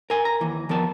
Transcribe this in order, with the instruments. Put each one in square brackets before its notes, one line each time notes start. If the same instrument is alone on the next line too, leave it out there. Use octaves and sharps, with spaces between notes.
[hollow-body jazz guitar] A#4 G#5
A#5
D#2 E3
F2 F3 B3 A#4 A5